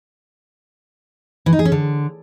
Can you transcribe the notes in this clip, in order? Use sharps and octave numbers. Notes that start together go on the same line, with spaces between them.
E3
D#4
G#4
C#4
D3